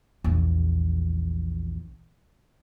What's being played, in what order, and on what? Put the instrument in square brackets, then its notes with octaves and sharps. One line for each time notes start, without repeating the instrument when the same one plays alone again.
[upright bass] A#1 E2